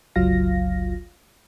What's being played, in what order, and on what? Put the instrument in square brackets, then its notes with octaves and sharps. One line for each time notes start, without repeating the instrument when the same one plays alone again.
[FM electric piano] G1 C#2 F#3 F4 F5 A#6